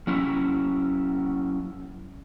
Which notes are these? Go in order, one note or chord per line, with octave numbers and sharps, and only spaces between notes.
F#3 C#4 E4